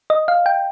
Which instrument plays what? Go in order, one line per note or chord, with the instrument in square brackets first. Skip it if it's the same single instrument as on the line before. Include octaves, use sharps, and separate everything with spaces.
[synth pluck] D#5
F5
G5